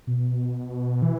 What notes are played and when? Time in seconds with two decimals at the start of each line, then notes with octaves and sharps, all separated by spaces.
0.07 B2
1.02 E3